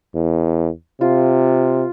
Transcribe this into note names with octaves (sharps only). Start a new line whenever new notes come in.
E2
C3 F4